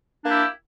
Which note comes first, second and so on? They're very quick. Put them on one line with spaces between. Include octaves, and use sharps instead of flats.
D4 A#3 G4 E4